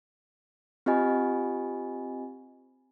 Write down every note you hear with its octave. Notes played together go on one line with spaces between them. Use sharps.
C4 F4 G4 D#5 G#5 B5